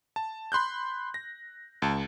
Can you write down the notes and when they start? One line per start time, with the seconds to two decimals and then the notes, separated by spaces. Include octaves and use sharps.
0.16 A5
0.52 B5 C6 F#6 G6
1.14 A#6
1.82 C#2 A5